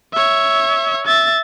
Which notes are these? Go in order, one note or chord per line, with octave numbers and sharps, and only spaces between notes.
C#5 E5
E5 A6